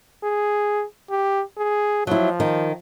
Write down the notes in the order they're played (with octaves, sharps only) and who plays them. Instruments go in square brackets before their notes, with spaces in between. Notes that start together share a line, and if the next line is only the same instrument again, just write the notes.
[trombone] G#4
G4
G#4
[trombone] F3 [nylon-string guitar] F#3 E4
[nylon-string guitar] D#3